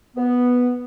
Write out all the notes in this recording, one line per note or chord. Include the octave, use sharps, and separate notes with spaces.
B3